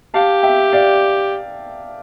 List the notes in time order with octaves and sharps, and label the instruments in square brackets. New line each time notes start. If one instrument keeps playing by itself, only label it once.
[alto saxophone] G4 [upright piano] F5 A5
[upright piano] E5 G5
D5 F5